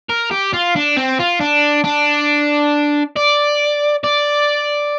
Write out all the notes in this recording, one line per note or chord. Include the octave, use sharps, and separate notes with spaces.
A#4
G4
F4
D4
C4
F4
D4
D4
D5
D5